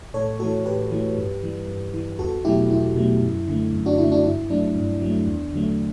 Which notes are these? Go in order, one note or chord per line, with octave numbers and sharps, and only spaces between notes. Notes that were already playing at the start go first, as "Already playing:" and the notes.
A2 A4 C#5
E3 A3 F#4 A4
A2 G4 B4
E3 A3
G2
E3 G3
G2
E3 G3
E2 F#4 A4
B2 F#3 A3 E4 G4
E2 E4
B2 F#3 A3
F#2
D3 A3
F#2
D4 F#4
D3 A3 E4
D4 F#4
G2 E4
F#3 A3 D4
G2
F#3 A3
E2
D3 F#3 A3